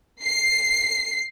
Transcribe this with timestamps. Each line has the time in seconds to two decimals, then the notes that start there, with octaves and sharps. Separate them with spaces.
0.23 C7